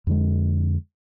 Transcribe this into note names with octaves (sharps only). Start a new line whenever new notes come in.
F2 D3 G#3